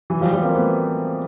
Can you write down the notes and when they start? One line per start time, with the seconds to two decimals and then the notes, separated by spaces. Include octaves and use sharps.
0.10 E3 F#3
0.21 F3 G3
0.33 F3 G3
0.44 A#3 C4
0.55 A3 B3